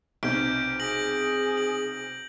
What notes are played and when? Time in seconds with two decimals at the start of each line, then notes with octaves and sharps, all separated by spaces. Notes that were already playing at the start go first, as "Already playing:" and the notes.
0.23 B1 C3 G6 D7
0.80 G#4 A#6 D7 F#7
1.57 F#7